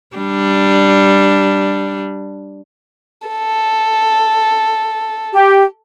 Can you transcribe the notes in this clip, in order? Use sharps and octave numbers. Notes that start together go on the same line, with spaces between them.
G3 D4
A4
G4